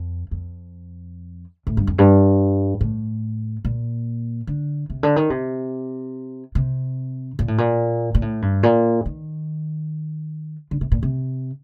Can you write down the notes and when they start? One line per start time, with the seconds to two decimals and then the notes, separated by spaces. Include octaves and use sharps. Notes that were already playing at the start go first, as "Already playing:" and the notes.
Already playing: F2
0.31 F2
1.67 A2
1.77 G2
1.87 F2
1.98 G2
2.81 A2
3.65 A#2
4.47 D3
4.90 C3
5.03 D3
5.16 D#3
5.30 C3
6.55 C3
7.39 A#2
7.48 A2
7.58 A#2
8.15 A#2
8.22 A2
8.42 G2
8.63 A#2
9.06 D#3
10.71 D3
10.81 C3
10.92 A#2
11.03 C3